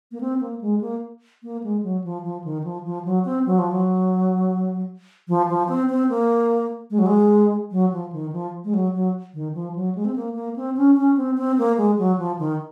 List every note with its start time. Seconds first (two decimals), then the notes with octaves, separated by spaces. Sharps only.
0.12 A#3
0.21 C4
0.40 A#3
0.61 G#3
0.81 A#3
1.43 A#3
1.63 G#3
1.83 F#3
2.04 F3
2.23 F3
2.44 D#3
2.64 F3
2.85 F3
3.05 F#3
3.25 C4
3.46 F#3
3.58 F3
3.71 F#3
5.28 F3
5.49 F3
5.68 C4
5.89 C4
6.09 A#3
6.91 G#3
6.99 F#3
7.06 G#3
7.71 F#3
7.92 F3
8.12 D#3
8.32 F3
8.64 G#3
8.74 F#3
8.94 F#3
9.34 D#3
9.54 F3
9.75 F#3
9.95 G#3
10.05 C4
10.16 A#3
10.35 A#3
10.56 C4
10.77 C#4
10.97 C#4
11.17 C4
11.38 C4
11.58 A#3
11.77 G#3
11.98 F#3
12.18 F3
12.39 D#3